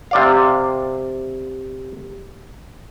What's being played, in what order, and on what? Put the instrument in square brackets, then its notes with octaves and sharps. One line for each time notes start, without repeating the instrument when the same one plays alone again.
[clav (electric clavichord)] C3 D5 F5